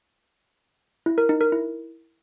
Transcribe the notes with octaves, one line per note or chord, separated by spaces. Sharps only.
E4
A#4
D#4
A#4
E4